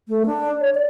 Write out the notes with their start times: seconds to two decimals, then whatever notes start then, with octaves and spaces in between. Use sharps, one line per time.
0.08 A3
0.26 D4
0.61 C#5
0.75 D5